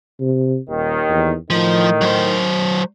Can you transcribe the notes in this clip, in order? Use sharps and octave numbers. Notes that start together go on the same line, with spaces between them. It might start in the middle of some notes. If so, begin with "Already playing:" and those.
C3
D#1 D#2 D#3
E2
A2 D#3 F3
F#3 C5